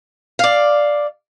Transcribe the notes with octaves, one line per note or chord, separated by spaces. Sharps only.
D5 F5